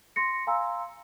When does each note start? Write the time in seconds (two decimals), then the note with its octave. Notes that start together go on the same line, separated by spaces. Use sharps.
0.16 C6 A#6 C#7
0.47 F5 G#5 A#5 C6 E6